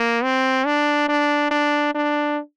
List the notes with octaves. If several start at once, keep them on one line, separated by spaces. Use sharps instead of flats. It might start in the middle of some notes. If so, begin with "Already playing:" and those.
Already playing: A#3
C4
D4
D4
D4
D4